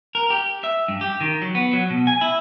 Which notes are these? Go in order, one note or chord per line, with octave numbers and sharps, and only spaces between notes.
A#4
G4
E5
G2
G4
D#3
F#3
B3
F#3
B2
G#5
E4